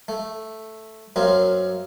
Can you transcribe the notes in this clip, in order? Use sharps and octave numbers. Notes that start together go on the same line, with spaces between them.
A3
F#2 A#3 C4